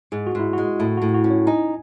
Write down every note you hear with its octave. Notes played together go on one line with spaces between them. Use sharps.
G#2 G#4
F#4
G#2 E4
G#3 F#4
A2 E4
A2 F#4
F#4
C#4
C#5
D#4 G#5